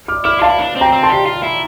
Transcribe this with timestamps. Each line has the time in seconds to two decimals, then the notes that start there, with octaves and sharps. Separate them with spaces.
0.08 D6 F6
0.25 E4 D6 F6
0.39 F4 F5 A5
0.49 E4
0.59 D4
0.76 C4
0.81 G5 A#5
0.93 C4
1.03 A5 C6
1.10 G4
1.26 F4
1.43 E4